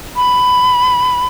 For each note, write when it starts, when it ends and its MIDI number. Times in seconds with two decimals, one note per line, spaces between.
0.16 1.27 83